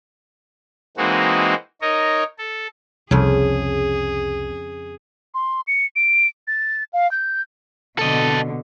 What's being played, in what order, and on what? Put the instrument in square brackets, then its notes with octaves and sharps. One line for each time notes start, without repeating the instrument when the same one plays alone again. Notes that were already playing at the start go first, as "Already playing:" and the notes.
[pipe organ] E3 G#3 A#3 C4 D#4 F#4
D#4 A#4 C#5 D#5
A4
[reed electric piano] C2 [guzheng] F2 C#3 [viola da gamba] G#4
[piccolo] C6
C#7
D7
A6
F5
G6
[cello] B2 D3 [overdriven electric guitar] A4 D#5